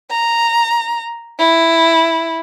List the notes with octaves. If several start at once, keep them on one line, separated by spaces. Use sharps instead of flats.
A#5
E4